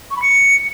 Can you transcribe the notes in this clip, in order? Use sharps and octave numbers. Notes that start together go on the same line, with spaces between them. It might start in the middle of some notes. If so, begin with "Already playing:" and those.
C#6
B5
C#7